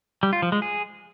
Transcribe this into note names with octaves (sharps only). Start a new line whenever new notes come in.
G3
F4
F3
G#3
G#4